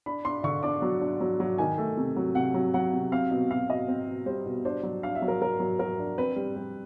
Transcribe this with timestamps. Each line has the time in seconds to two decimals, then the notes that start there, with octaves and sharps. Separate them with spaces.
0.06 D4 B5
0.25 D4 C6
0.44 D3 C#6
0.63 D4 D6
0.82 F#3
1.01 D4
1.21 F#3
1.40 F#3
1.58 D#3 G#5
1.78 A3
1.97 C3
2.16 F#3
2.35 C3 F#5
2.54 F#3
2.74 F#3 F#5
2.93 C3
3.12 C4 F5
3.31 B2
3.50 B2 F5
3.69 B2 D#5
3.88 C4
4.07 B2
4.26 G3 C5
4.46 B2
4.65 D4 C5
4.83 F#3
5.03 D4 F5
5.15 E5
5.22 F#3
5.28 A#4
5.41 F#3 A#4
5.60 F#3
5.79 F#3 A#4
5.99 D4
6.18 C4 B4
6.36 G3
6.56 G3